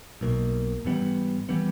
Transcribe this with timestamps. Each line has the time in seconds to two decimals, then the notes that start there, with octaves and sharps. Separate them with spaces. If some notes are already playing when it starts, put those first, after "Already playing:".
0.21 B1 B2 A#3
0.85 G#2 E3 G3 B3
1.49 E3 G3 B3